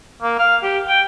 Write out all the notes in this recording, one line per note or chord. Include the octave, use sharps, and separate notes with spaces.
A#3
F5
G4
G5